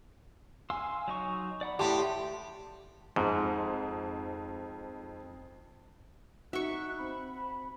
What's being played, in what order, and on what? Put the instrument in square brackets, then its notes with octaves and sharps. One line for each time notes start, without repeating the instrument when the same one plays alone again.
[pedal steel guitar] F5 C6 E6 [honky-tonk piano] G#5
[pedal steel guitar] F#3 D#4 C#6
D5 F#5 B5
[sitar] A2 G4 [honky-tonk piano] A5 C6
[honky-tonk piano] F2 [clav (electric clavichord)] G#2
[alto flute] D#4 [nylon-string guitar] F#4 [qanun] E5 C#6 [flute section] F#6
[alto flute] C4 [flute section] B5